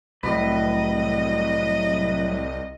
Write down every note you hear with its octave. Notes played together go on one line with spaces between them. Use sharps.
C2 A2 F#3 B4 D#5